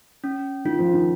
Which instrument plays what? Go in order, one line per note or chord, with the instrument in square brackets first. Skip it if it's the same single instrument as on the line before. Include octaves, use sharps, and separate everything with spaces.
[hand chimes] C#4
[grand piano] D#3 [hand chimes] F4
[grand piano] F3
D#3